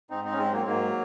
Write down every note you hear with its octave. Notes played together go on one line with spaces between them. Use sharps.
G#2 C4 D#4
C4 D#4
C#4
G#2 G#3 C4
F#3 A#3
G#2 F#3 A#3